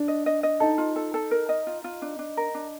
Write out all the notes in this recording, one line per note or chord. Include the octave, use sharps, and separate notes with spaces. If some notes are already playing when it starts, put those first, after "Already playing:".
Already playing: D4
D#5
D#5
D#5
D#4 A4
F4
A4
A4
A#4
D#5
F4
F4
D4
D4
A#4
D4